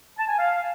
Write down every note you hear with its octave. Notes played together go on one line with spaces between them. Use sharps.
A5
G#5
F5